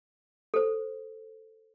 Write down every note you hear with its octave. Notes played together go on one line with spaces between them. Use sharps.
A4 C5